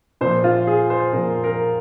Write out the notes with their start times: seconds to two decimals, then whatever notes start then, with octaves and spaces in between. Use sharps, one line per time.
0.21 A#2 F3 C5
0.44 F4
0.67 G#4
0.90 C5
1.13 A#2 F3 A#4
1.44 A#4